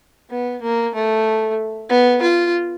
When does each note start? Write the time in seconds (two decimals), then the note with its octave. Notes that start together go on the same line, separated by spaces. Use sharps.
0.30 B3
0.62 A#3
0.94 A3
1.90 B3
2.22 F4